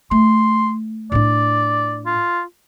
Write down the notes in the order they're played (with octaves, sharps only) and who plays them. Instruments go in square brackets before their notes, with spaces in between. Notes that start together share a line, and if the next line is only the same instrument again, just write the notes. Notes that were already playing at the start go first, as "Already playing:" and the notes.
[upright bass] A3 [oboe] C6
[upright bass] A2 D4 [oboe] D5
[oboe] F4